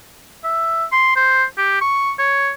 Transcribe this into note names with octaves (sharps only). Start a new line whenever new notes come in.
E5
C6
C5
G4
C#6
C#5